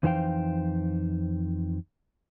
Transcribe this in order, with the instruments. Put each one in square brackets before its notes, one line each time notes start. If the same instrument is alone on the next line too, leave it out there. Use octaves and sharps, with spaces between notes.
[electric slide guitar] F2 E3 D#4 C5 F5 G5